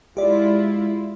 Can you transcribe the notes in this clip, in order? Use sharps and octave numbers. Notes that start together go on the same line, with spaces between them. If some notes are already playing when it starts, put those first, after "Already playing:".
G#3 E4 F4 G4 D5